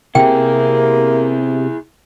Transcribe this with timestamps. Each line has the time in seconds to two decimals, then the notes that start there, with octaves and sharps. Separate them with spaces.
0.15 C3 A#3 E4 G#4 G5